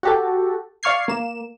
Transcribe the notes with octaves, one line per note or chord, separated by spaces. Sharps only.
F#4 G4 A4
D5 F5 C#6 F6 G#6 C7
A#3 E7